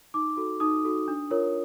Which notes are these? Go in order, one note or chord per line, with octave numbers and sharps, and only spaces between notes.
D#4 D6
F#4 A4
D#4 D#6
F#4 A4
D4
F4 A#4 C#5